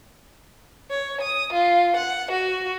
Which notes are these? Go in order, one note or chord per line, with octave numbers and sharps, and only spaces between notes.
C#5
D#6
F4
F#5
F#4